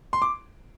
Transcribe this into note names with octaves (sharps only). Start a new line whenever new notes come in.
C6
D6